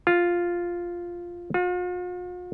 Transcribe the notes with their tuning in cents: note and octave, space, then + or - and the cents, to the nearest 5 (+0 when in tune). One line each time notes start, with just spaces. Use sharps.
F4 +0
F4 +45